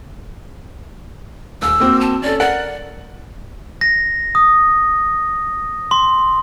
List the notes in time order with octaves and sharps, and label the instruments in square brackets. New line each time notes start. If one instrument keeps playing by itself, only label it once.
[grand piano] D#1 [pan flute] E6
[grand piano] A#3 C4 F#4
[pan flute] A5
[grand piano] C#4 A4 [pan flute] D5
[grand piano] A#4 F#5 [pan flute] D5
[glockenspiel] A#6
D#6
C6